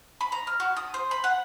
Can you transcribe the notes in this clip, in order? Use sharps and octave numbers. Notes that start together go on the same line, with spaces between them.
B5
A#5
F6
F#4
D#6
C5
B5
F#5